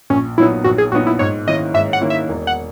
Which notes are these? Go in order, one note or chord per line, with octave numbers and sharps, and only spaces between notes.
A#1 C#4
A#2 F#3 B3 D#4 E4
A#1 F#4
G#4
A#2 F#3 B3 D#4 F#4
E4
G#2 C#5
D#3 A#3 C#4 E4 D#5
G#2 E5
F#5
D#3 A#3 C#4 E4
E5
E1
F#5